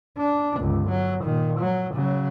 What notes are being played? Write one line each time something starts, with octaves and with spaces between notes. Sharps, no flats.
D4
G1 C#2
F#3
A#2 D#3
F#3
C#3 F#3